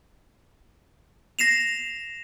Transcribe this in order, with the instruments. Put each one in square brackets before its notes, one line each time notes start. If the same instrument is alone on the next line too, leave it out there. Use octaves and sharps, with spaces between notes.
[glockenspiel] A#6 C7 E7 F7